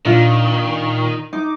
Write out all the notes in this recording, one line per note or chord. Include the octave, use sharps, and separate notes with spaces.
A#2 D#3 D4 F4
D#4 D6